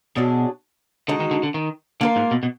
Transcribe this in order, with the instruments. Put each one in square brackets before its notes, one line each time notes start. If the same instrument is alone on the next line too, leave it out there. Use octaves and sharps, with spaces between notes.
[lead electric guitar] B2 [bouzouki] F#3 D4 G#4
[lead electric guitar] D3 [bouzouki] G#3 D#4 F#4
[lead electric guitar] D#3
D3
D3
D#3
[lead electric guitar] D3 [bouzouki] A#3 F4 A#4
[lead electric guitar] G#2
B2
B2